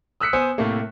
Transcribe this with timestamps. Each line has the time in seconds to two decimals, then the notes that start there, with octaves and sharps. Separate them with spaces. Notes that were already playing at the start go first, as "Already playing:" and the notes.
0.20 D#6 E6 F#6 B6 C#7
0.33 B3 C5 G#5 D#6 E6 C#7
0.58 A2 C3 A3 A#3